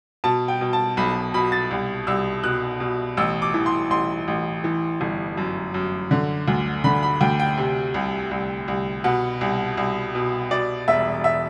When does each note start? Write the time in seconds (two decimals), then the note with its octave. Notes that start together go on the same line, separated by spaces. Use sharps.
0.24 B2 A5
0.48 G5
0.61 B2
0.73 A5
0.97 B1 B5
1.34 B2 B5
1.52 A6
1.71 C2
2.07 C2 E6
2.44 B2 F#6
2.80 B2
3.17 A1 E6
3.42 D6
3.54 E3
3.66 C6
3.90 A1 C6
4.28 A1
4.64 E3
5.01 G1
5.37 F#2
5.74 F#2
6.11 D3
6.48 D2
6.84 D3 B5
7.03 B5
7.21 D2 G5
7.39 G5
7.58 C3
7.94 C2
8.31 C2
8.68 C2
9.04 B2 F#5
9.41 C2
9.77 C2
10.15 B2
10.51 B2 D5
10.88 E1 E5
11.24 E5